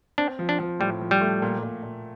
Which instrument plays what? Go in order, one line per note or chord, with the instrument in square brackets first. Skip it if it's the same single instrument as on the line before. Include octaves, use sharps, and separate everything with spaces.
[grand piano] C4 [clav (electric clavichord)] D4
[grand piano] F3
[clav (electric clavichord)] D4
[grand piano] F3
[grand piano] A2 [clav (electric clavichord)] G3
[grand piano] F3
[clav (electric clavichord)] G3
[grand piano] A3
A#2
A#2
A#2